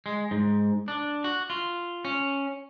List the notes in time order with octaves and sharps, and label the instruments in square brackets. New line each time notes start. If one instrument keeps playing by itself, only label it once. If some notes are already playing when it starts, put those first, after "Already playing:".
[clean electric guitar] G#3
G#2
D4
F#4
F4
C#4